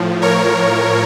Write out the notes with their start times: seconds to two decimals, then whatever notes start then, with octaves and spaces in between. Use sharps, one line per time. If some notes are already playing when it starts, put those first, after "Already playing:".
Already playing: A2 F3
0.22 A#4 C#5